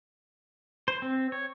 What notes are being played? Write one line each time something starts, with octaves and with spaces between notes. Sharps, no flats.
C5
C4
C#5